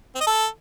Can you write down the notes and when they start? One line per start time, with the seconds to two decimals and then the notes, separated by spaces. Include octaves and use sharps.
0.15 C4
0.21 D#5
0.27 A4